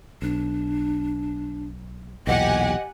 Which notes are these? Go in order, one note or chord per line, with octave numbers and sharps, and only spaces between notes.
B1 D4
B1 E2 A#2 G4 D#5 F#5 G#5